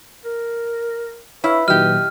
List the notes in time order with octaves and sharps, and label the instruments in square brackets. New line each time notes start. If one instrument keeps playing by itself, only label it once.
[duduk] A#4
[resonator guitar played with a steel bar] E4 [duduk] B4 [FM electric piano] C#5 F5
[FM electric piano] A#2 D#3 F#3 [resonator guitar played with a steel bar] G4 D#5 [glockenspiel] F6